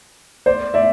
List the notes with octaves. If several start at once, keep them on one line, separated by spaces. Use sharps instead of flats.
C5 D5
D5 E5